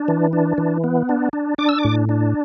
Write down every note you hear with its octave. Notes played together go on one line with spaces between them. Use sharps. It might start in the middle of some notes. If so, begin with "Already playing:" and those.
Already playing: D4
E3
D4
E3
B3
D4
D4
D4 D6
E6
D6
A2
D4